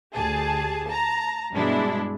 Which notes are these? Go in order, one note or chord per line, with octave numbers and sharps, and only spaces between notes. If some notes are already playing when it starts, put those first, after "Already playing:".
D2 G4 G#4 A5
A5 A#5
G2 B2 G#3 D4 E4